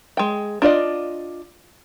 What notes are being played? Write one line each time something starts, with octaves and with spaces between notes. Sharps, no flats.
G#3 G5
D4 F4 D5 D#5